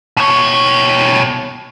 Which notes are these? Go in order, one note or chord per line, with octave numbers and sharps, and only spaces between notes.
B2 C#5